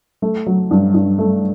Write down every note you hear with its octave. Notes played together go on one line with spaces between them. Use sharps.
A3
F#3
G2
G2
A3